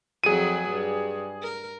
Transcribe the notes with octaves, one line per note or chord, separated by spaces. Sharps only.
F2 F#3 G#4 D#7
G2
A#4